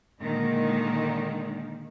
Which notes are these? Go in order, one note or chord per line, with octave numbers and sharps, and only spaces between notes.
A#2 D3 D#3 G#3 A#3